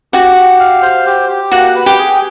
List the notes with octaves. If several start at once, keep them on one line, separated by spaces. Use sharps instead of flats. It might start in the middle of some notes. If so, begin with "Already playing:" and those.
F#4 G4 F#5
G4
F5
C5
G4
G4
A#3 F#4 F#5
B4
G4 G5
G#4